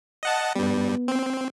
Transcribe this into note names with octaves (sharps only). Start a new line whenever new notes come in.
D#5 F#5 A5
G2 G3 B3
C4